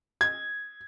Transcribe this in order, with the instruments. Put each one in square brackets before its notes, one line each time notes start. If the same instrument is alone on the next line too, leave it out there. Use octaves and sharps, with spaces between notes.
[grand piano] G#6